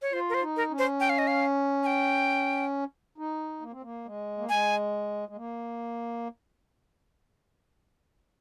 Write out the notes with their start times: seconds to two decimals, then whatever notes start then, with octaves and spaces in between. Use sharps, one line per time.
0.02 C#5
0.13 F4 C5
0.29 A#4
0.34 C5
0.42 D#4
0.57 A#4
0.71 C#4
0.79 C5
1.00 G5
1.09 F5
1.18 D#5
1.27 F5
1.83 G#5
1.87 G5
3.18 D#4
3.61 A#3
3.72 C4
3.83 A#3
4.05 G#3
4.38 A#3
4.49 G#3 G#5
5.29 G#3
5.36 A#3